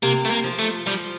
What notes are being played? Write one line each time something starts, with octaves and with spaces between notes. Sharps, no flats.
C3 A#3
A3
A#3
F3
A3
F3 G3